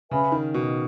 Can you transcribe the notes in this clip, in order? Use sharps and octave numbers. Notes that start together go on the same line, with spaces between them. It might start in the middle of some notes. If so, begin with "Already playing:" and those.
C#3 B4 E5 G#5 B5
D#3
B2